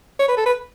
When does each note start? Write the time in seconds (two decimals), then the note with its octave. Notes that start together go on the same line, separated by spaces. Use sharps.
0.19 C#5
0.28 B4
0.37 A4
0.46 B4